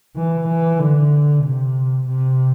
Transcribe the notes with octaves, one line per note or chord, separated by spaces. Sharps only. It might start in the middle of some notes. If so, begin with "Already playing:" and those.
E3
E3
D3
C3
C3